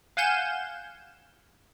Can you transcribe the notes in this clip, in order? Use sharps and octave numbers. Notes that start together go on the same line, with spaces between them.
F5 F#5 G#5 G6 E7